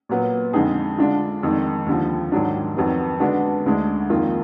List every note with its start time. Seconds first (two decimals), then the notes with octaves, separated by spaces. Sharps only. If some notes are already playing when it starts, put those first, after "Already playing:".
0.09 A#2 F#3 B3
0.53 F2 D3 G#3 D#4 G#4
0.98 D3 G#3 D4 F4
1.43 F2 D#3 G#3
1.86 D#2 D3 F3
2.32 G#2 D#3 F#3 D4
2.77 F2 D#3 F#3 B3
3.20 D3 G#3 B3 D4 F#4
3.66 D2 D3 G#3 D4
4.09 F2 D#3 A#3 F4